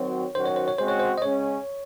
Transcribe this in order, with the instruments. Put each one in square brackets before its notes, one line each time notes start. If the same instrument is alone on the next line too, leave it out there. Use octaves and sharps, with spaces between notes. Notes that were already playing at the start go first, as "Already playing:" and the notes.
Already playing: [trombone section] D#3 F#3 C4 F#4 [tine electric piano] C#5
[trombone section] D#3 F#3 C#4 F#4 [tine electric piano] C5
[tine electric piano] C#5
C5
C#5
[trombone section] C#3 G#3 C4 F#4 [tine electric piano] C5
[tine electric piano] C#5
C5
D#5
[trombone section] C#3 G#3 C#4 [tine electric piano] C#5